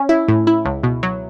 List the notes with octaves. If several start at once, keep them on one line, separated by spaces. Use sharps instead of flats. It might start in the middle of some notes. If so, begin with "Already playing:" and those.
Already playing: C#4
E4
A2
E4
C#2
B2
F#3